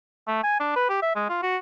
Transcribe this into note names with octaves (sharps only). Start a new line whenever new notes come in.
A3
G#5
D4
B4
G4
E5
G#3
F4
F#4